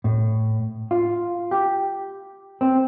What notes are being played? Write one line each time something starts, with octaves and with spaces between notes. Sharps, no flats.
A2
F4
G4
C4